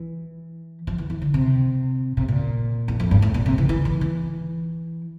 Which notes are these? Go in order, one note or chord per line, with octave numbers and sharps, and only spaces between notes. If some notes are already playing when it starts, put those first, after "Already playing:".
Already playing: E3
F3
E3
E3
D3
C3
C3
A#2
E2
F2
G2
A2
A#2
C3
E3
E3
E3
E3